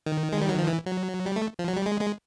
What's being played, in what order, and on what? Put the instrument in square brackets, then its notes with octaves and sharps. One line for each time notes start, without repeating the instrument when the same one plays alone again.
[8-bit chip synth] D#3
G#3
G3
F#3
F3
E3
F#3
G3
A3
F3
F#3
G3
G#3
G#3